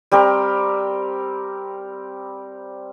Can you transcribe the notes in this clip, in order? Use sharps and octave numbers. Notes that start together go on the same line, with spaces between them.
G3 C4 G4 A#4